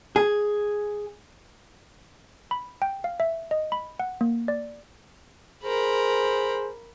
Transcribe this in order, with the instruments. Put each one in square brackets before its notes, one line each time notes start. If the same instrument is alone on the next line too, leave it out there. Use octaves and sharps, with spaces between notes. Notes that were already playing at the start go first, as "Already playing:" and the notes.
[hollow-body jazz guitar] G#4
[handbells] B5
G5
F5
E5
D#5
B5
F#5
A#3
D5
[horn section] G#4 C5 [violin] A#4 B5